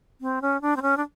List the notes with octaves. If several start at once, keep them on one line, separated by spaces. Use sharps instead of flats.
C4
C#4
D4
C4
C#4
D4